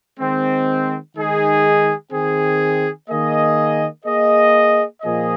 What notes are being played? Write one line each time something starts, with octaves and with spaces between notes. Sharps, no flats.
D#3 G#3 C4
D#3 G#3 D#4 G#4
D#3 C4 G#4
D#3 A#3 G#4 D#5
A#3 G#4 D#5
A#2 F3 A#3 G#4 D#5